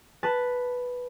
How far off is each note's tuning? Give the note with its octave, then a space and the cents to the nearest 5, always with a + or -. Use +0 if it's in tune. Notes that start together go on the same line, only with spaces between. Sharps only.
B4 +0 A5 +0